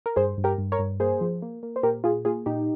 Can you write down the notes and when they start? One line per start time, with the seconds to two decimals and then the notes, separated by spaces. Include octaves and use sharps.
0.06 A#4
0.16 G2 G#4 C5
0.38 G2
0.44 G4 A#4
0.58 G2
0.72 A#4 C#5
0.79 G2
1.00 A#3 G#4 C5
1.21 F3
1.42 A#3
1.63 A#3
1.76 C5
1.83 A#2 G4 A#4
2.04 A#2 F4 G#4
2.25 A#3 F4 G#4
2.46 A#2 D#4 G4